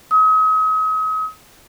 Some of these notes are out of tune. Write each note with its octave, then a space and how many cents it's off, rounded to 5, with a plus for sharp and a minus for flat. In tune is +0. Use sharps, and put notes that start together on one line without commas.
D#6 +40